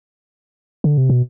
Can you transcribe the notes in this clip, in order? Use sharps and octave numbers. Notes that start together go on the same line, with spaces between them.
D3
C3
B2